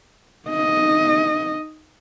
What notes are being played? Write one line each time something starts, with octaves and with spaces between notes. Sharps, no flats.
D#4 D#5